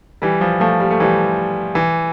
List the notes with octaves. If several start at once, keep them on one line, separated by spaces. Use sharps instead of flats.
E3 G3
F3
F3 A3
G3
A3
E3 G3
E3